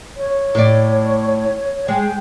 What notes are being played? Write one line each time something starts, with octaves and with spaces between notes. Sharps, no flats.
C#5
A2 D5
G#3 G5